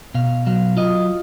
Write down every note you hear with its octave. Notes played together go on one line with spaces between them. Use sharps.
B2 F5
F#3 F5
F4 D#5